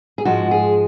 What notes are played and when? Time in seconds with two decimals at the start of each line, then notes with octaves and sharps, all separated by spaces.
0.18 G#4
0.25 G#2 F3 G#3 F#4
0.51 G#4